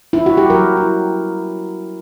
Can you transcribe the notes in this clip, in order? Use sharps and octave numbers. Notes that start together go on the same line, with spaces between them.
E4
F#4
G4
F#3 A#4
E4